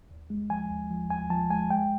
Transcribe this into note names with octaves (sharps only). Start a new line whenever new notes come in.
D#2
G#3
F3 G#5
D#2
F3
D#2 G#5
F3 A5
G#3 G#5
G#3 G5